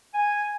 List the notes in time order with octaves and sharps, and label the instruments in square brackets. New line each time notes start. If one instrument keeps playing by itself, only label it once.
[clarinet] G#5